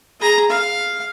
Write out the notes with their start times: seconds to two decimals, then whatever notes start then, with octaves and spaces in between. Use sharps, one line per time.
0.20 G#4 A#5
0.50 F5